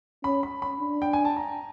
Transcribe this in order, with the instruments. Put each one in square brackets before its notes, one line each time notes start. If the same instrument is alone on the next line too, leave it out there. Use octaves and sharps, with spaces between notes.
[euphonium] C#4 [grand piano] B5
[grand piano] B5
B5
[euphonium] D4
[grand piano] G5
G#5
A5
A#5